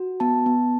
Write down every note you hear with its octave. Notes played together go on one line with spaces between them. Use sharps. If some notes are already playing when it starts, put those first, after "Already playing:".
Already playing: F#4
B3 A5
B3